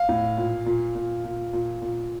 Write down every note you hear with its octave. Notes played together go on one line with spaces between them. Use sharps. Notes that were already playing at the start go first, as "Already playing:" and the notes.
Already playing: F5
A2
A#2
A#2
A#2
A#2
A#2
A#2